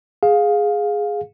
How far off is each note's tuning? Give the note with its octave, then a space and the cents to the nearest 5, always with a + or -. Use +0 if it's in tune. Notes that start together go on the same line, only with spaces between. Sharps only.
G#4 +0 F5 +20